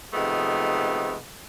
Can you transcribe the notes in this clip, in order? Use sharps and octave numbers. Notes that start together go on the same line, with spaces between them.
C3 D#3 F3 G#3 A3 B3